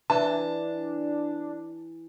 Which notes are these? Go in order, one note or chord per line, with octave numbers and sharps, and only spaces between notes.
E3 D4 A5